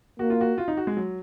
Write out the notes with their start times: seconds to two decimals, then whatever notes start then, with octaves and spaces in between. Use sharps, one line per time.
0.19 A#3 F#4
0.30 F4
0.41 F#4
0.58 F4
0.68 D#4
0.77 F#4
0.87 G#3
0.97 F#3